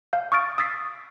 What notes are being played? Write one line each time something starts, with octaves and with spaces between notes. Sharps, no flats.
F5 G6
C#6 D#6 F6 A6 D7
D#6 E6 A6 B6 C7